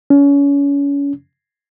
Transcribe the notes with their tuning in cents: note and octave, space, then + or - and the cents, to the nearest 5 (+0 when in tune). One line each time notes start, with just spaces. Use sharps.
C#4 +30